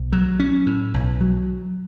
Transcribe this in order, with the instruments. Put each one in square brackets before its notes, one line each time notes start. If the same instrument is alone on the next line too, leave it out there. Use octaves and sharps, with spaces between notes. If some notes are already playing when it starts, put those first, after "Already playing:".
Already playing: [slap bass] B1
F#3
C#4
A2
B1
F#3